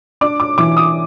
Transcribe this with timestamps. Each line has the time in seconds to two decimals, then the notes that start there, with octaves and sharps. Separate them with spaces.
0.21 D4 D6
0.40 D6
0.58 E3 D6
0.77 D#6